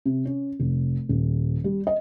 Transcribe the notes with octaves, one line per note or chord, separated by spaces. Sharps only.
C3
C#4
F1
D#1
G3
D#5